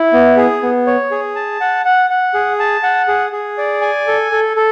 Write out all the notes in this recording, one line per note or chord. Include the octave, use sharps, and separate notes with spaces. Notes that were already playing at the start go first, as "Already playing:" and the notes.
Already playing: E4
B3
G#4
B3
C#5
G#4
A5
F#5
F#5
F#5
G#4
A5
F#5
G#4
G#4
D5
G#5
A4
A4
A4